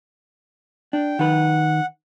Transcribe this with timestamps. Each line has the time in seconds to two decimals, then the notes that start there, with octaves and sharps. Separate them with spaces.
0.93 D4 G5
1.19 D#3 B4 F#5